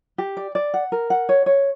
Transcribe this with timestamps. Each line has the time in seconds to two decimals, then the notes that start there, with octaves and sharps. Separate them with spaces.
0.18 G4
0.37 D5
0.55 D5
0.74 F#5
0.92 A#4
1.10 F#5
1.29 C#5
1.46 C#5